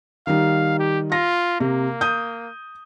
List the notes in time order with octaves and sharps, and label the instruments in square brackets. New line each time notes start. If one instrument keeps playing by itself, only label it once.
[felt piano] D#3 G3 D#4 [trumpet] F5
[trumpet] G4
[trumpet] F4 [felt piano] A#6
[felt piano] C3 [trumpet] A#3
[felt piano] D#6 G6